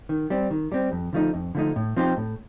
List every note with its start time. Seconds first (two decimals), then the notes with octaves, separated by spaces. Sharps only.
0.09 D#3
0.30 G3 C4
0.51 D#3
0.72 G3 C4
0.92 F2
1.13 D3 F3 A3 D#4
1.34 F2
1.55 D3 F3 A3 D#4
1.76 A2
1.97 F3 C4 D#4 G4
2.17 A2